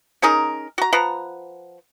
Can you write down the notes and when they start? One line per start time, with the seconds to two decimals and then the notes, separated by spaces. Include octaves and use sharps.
0.22 C#4 D#4 G#4 A#4
0.78 F#4 A#5
0.93 F3 B4 F#5 A#5